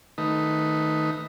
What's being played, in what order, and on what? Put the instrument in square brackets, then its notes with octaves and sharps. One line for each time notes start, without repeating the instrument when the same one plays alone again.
[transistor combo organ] D#3 A3 D#4 B4